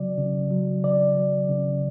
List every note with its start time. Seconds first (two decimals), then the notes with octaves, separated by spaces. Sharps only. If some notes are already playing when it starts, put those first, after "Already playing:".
Already playing: C#3 F#3 D5
0.17 C#3
0.51 F#3
0.83 C#3 D5
1.16 F#3
1.49 C#3